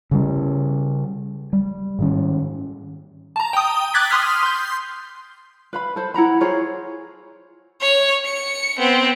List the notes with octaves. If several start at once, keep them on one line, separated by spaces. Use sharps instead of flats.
C#3 G3 C#4
G3
G#2 D#3 C#4
A5 A#5
G5 D#6
D6 F#6 G#6 A6 B6
C6 D#6 F6 B6
C6 G6
B4 F5 B5
A4 C5
E4 F#5 A#5 B5
F4 G#4 C5 C#5
C#5 F7
C#7
B3 C4